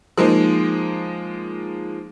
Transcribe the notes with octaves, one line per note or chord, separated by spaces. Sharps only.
F3 G#3 A#3 D#4